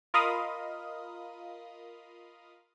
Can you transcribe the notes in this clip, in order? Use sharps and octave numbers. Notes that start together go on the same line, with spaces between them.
F4 A#4 D#5 F5 B5 D#6